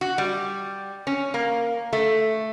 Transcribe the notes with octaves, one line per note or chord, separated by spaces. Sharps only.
F#4
G3
C#4
A#3
A3